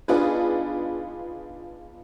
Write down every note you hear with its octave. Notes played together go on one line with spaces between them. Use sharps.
B3 D4 D#4 F4 G#4 B4